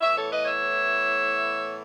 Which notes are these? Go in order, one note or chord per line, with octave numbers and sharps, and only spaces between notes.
A2 E3 B3 C#5 E5
A4 C#5
B4 D#5
C#5 E5